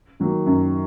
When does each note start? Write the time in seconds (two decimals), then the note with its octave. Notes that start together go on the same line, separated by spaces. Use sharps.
0.20 D#3 F#3 A#3
0.46 F#2